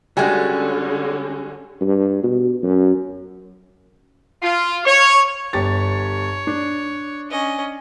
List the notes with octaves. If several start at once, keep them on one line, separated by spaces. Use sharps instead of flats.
D3 G3 G#3 C#4 F#4 G#4
G2
B2
F#2
F4
C#5
G1 G4 C#5 A6
D4
C#4 D#5